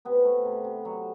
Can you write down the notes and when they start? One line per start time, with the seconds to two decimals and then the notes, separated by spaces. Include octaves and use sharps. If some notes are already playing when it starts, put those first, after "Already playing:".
0.05 C3 B3
0.25 A3
0.45 C3
0.64 C3
0.85 F#3